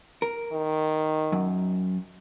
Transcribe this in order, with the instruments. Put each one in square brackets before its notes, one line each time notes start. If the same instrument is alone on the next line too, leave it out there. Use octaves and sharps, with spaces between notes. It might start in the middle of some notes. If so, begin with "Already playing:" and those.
[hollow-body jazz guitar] A#4
[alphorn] D#3
[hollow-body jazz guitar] F#2